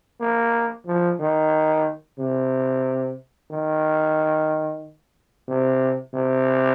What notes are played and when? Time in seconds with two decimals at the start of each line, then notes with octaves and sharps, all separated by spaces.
0.20 A#3
0.86 F3
1.19 D#3
2.18 C3
3.50 D#3
5.48 C3
6.13 C3